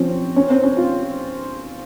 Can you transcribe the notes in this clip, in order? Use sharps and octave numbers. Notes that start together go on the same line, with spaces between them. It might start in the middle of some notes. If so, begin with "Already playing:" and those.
Already playing: F3 C4 C#4
C#4
C4
C#4
F4